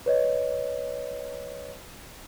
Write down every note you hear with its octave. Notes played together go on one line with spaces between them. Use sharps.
B4 C#5 D#5